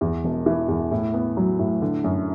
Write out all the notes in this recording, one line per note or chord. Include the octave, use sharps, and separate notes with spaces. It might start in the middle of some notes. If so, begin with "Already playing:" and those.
E2
E1
E3
E2
A2
B3
F#3
A2
D3
F#2